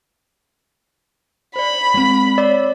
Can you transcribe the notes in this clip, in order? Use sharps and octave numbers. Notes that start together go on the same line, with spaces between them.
C5 D5 B5
G#3 C4
C#5 D5 E6